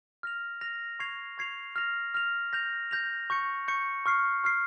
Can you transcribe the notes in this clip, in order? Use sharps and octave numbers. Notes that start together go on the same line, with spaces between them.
F6 A#6 F7
F6 A#6 F7
C#6 G#6 C7 F7
C#6 G#6 C7 F7
F6 A#6 F7
F6 A#6 F7
G6 A#6 F7
G6 A#6 F7
C#6 G6 C#7
C#6 G6 C#7
C#6 F6 C7
C#6 F6 C7